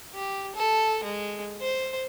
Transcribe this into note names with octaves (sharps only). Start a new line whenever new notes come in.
G4
A4
G#3
C5